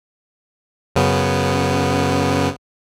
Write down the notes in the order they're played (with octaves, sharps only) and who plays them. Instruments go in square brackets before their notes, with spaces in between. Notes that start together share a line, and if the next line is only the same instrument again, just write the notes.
[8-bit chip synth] F#2 C#3 B3